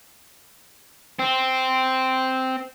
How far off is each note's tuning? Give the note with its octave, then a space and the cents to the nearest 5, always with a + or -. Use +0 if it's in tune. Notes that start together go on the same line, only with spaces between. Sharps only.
C4 -5